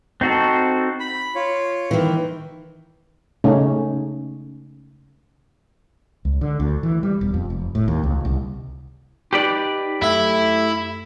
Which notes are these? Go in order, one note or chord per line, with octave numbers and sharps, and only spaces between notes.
C4 D#4 F#4 A4
B5
F4 C#5
D#3 E3
C#3 A3 C#4 D#4
C#2
D3
D2
E3
G3
E1
F2
F1
A2
D#2
C#2
C2
D#4 G4 B4 D5
F#2 A3 E4 E5